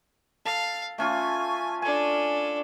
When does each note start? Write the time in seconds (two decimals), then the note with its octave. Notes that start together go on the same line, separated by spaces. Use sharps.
0.45 A4 F5
0.98 A3 C#4 F4 G#5
1.82 D4 A4 G#5